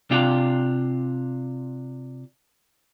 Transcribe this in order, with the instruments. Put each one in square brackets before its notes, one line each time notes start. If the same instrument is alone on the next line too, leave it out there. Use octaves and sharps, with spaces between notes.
[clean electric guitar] C3 D4 F4 G4